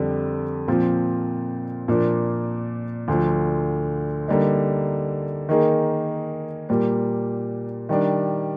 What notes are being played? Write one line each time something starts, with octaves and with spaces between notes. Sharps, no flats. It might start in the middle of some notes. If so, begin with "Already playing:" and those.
Already playing: F2 D3 G3 D4
A#2 F3 C4 F4
A#2 F3 A#3 D4
D2 D3 F3
D3 G3 A#3 D#4
D#3 A#3 D#4 G#4
A#2 G3 A#3
D#3 G3 D4